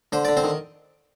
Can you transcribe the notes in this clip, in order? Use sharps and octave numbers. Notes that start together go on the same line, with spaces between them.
D3 C5
D3 D5
C4 C5
D#3